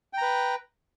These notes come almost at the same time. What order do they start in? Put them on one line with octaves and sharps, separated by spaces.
G5 A#5 B4